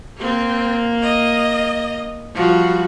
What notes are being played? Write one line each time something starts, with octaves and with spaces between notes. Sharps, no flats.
A#3 C4
D#5
F3 G3 F#4